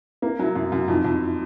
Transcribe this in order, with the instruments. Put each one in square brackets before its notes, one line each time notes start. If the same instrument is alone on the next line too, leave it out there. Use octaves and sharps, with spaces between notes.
[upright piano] A#3 [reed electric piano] E4
[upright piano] F#3 [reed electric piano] E4
[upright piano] F#2
[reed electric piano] E4
[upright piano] F#2
[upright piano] F2 [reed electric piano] D#4 F4
[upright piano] F2